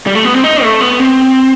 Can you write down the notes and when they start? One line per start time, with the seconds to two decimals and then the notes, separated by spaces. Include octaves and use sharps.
0.06 G3
0.15 A3
0.25 B3
0.34 C4
0.44 D#4
0.63 A3
0.81 B3
1.00 C4